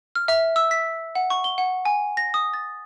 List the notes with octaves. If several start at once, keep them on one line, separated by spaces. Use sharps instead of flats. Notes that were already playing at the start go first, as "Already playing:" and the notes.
F6
E5
E6
B6
F#5
C#6
G7
F#5
G#5
A#6
D#6
A6